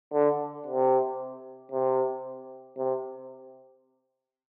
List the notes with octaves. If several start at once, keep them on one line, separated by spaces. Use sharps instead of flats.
D3
C3
C3
C3